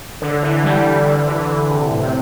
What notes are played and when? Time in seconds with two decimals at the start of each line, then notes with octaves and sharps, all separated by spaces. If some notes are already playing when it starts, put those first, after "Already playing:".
0.22 D3
0.43 E3
0.64 G3
0.79 G3
0.92 E3
1.06 D3
1.27 E3
1.48 D3
1.70 C3
1.91 A2
2.02 C3